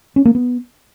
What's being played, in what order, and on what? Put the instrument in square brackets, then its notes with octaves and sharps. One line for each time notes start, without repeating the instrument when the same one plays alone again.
[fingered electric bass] C#4
A#3
B3